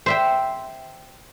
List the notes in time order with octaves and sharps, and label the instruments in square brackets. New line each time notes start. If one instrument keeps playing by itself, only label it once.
[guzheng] C5 E5 G5